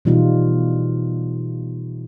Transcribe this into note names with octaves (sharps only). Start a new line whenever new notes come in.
B2 E3 G3 D#4 F4